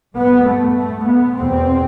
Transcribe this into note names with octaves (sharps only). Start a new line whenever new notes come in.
G2 B3
A3
A3
B3
E2 B2 C4